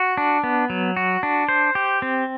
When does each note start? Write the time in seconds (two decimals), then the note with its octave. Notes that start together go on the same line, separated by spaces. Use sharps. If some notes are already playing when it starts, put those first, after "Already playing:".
Already playing: F#4
0.17 D4
0.44 B3
0.70 F#3
0.97 F#4
1.23 D4
1.49 C5
1.75 G4
2.02 C4